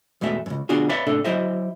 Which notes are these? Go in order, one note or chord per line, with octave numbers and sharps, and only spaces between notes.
E2 B2 G#3 A3 E5
C#2 F#2
D2 B2 D4 F4 F#4 G#4
B4 C#5 D5 E5 F5 B5
A2 C3 D4 A4
F#3 E4 C5 D#5 E5